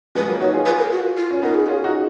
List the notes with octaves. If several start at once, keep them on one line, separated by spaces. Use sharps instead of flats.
F3 G#3 B4
F#3 A#3
D#4 F#4 C#5
F4 G#4
F4 G#4 B4
A#4
F#4
F4
C#4
B3 D#4 A#4
G#4
C#4 F4 F#4
G#4
D#4 F#4